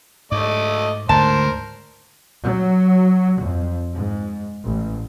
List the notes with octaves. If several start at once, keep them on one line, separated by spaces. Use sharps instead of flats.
G#2 A3 D#5 D6
D2 G#2 D3 A#4 C5 A5
F#3
F2
G#2
A1